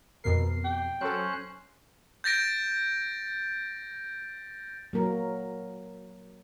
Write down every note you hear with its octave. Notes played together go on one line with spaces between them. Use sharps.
F2 B2 A#4 C7
G5
F#3 C#4 A4 C5 F#6
G6 A6 A#6 D7
F#3 A#3 A#4